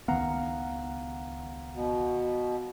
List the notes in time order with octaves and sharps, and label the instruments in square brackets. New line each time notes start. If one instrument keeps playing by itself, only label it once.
[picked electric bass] C#2 D#3 B3 [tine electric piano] F5 F#5 A#5
[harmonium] B2